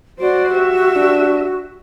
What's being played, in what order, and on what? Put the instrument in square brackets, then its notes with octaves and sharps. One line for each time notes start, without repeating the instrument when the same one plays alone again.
[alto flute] F#4 [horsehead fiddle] C5 D5
[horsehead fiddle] G4 E5
[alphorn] D4